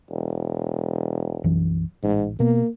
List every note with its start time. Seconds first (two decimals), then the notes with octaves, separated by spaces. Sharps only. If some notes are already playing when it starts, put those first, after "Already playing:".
0.10 E1
1.44 B1 F#2 E3
2.03 A1 G#2
2.40 B2 A#3 B3